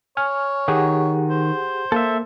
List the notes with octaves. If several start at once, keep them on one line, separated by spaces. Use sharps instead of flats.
C#5 G#5 F6
D#3 G4 G#4 F#5
C5
A#3 A4 E5